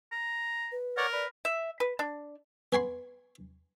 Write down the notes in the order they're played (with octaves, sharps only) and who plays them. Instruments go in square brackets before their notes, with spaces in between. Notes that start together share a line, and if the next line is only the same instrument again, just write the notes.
[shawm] A#5
[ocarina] B4
[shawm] A#4 [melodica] C#5 D5 F#5
[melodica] B4 [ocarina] D5
[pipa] E5
B4
D4
[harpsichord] B3 G#5 B5 C6